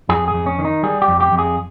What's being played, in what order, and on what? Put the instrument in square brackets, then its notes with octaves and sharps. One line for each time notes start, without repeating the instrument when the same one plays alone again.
[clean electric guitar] F2 G#4
G#4
F2
C#4
D#3
D#4
G3 G#4
G4
F2
G4
F2
G#4